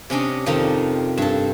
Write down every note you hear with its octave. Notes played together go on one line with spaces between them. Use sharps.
C3 C#4 D4 D#5
F2 C3 D#3 F3 A#5
G2 A4